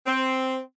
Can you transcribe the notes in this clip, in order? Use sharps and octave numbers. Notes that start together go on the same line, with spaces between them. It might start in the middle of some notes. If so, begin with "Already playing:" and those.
C4